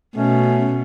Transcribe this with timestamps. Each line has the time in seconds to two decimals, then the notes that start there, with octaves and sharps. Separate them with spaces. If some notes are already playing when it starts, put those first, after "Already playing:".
0.16 B2 A3 C#4